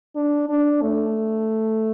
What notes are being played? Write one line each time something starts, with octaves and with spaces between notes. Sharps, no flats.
D4
D4
A3